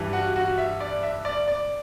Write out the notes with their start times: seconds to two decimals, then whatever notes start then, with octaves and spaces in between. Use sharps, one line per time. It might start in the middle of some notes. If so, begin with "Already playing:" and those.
Already playing: G2 E3 G3
0.13 F#4 F#5
0.36 F#4 F#5
0.58 E5
0.80 D5
1.03 E5
1.25 D5
1.48 D5